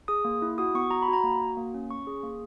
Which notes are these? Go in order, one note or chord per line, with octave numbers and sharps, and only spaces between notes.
G#4 D#6
A#3
E4
F#4 D#6
B3 C#6
F#4 A#5
B5
F#4 A#5
A#3
F#4
A#3
C#4
C#4 C#6
G#4
A#3